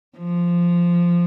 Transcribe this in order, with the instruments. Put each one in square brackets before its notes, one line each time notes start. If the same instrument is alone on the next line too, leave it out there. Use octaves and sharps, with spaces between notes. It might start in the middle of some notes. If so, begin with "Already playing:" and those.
[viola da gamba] F3